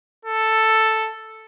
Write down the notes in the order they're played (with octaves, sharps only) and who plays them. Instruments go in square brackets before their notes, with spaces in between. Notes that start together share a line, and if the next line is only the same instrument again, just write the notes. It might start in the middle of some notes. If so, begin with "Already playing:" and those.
[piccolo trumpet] A4